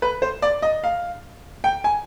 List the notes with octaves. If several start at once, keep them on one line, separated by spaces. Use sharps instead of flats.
B4
C5
D5
D#5
F5
G5
G#5